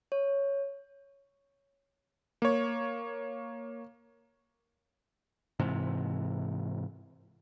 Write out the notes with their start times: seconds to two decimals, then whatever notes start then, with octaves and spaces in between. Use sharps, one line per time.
0.12 C#5
2.42 A#3 C#5
5.59 G#2 C3 E3